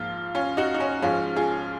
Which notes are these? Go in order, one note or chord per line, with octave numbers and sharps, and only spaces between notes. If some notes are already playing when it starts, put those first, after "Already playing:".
Already playing: G#2 F3 A#3 F4
C#4 F4
D#4 F#4
D#4
C#4
G#2 F3 G#3 C#4 F4
F4 G#4